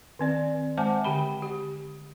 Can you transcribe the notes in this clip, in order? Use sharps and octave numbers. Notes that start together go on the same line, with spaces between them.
D#3 C4 D5
G#3 C5 F#5 G#5 A5 D6
D3 G4 G5 B5
G4